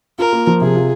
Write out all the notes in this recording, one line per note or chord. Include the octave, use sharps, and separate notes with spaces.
F4 A#4
A#3
F3
C3 G#4
F4